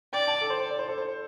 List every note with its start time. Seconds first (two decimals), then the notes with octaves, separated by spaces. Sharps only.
0.13 D5 G5
0.27 A5
0.41 A4
0.50 C5
0.70 D5
0.79 C5
0.88 A4
0.98 C5